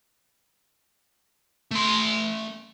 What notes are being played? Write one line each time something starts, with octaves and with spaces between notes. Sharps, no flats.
A3 C6